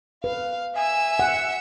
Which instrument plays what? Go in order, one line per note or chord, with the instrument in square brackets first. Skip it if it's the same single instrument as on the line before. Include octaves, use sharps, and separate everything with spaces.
[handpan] B4 [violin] F5
[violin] E5 E6 [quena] G#5
[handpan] F#5